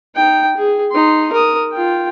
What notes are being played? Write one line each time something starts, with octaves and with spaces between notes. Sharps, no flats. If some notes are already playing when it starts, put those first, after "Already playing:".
D#4 G5
G#4
D#4 C6
A#4 D#6
F4 G5